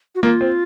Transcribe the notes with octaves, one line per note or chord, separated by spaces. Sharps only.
F#4
A#3 F4
C4